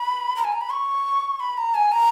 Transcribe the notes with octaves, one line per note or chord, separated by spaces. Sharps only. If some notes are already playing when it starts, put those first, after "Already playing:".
Already playing: B5
A#5
G#5
A#5
B5
C#6
B5
A#5
G#5
A#5